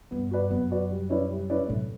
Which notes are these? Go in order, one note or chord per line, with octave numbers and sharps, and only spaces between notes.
G2 B3
F#4 B4 D5
F#2 B3
F#4 B4 D5
G3
C#4 E4 B4 D5
G3
C#4 E4 B4 D5
F#2 A2